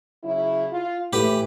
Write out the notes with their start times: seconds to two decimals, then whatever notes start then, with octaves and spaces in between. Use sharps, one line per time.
0.23 C#3 F#3 E4
0.70 F4
1.13 A2 E3 G4 B4